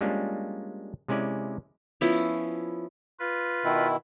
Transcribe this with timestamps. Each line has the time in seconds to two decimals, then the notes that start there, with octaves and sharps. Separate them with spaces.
0.01 G3 G#3 A#3 C#4 D4 F4
1.08 C3 G#3 C#4 E4 D5 G#5
2.01 F3 B3 C#4 E4
3.20 F4 B4
3.64 B2 D#3 E4